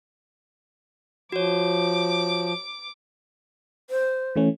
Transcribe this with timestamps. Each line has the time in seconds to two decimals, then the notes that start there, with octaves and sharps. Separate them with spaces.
1.32 F3 F#4 C#5 D6
3.90 C5
4.36 E3 A3 C#4